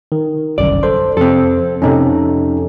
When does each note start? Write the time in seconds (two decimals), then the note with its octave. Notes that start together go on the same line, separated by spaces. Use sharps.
0.12 D#3
0.58 G1 C2 F#2 D5
0.83 A4 C5 C6
1.17 F2 C3 C4 A4
1.82 F2 A2 C3 C#4 D#4 A4